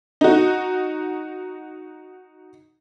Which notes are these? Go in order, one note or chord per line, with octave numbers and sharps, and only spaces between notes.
D#4 F#4